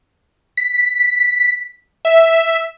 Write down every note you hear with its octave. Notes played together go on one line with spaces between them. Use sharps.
B6
E5